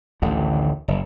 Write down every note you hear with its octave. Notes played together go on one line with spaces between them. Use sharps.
A1 D2 D3 D#3
F#1